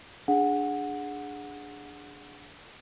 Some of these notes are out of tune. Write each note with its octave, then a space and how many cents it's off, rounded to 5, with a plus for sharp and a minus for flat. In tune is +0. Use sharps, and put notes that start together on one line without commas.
D4 +0 G#4 +0 F#5 -15